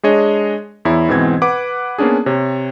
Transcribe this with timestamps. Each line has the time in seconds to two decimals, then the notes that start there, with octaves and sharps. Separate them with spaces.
0.03 G#3 D4 G#4 C#5 D#5
0.85 E2 E4 C#5
1.09 G#2 B2 E3 C4 G#6
1.42 B4 F#5 D6
1.98 A#3 B3 C#4 D4 G#4
2.26 C3 C#5